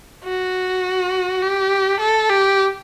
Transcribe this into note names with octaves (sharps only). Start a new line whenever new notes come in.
F#4
G4
A4
G4